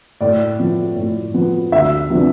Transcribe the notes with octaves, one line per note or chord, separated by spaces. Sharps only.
A2 D5
F3 B3
A2
F3 B3
D2 E5
C3 F3 B3 D4